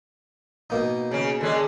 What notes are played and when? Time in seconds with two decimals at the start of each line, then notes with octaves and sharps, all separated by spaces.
0.70 B2 A#3 D#4
1.11 C#3 C#4
1.41 D3 G#3 C#4